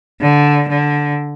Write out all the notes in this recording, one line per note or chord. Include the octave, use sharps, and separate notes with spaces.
D3
D3